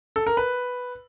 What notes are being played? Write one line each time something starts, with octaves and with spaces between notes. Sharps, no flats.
A4
A#4
B4